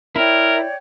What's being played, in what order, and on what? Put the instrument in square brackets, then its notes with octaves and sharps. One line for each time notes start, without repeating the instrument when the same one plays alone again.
[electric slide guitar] E4 [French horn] A#4 [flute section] C#5 D5 G5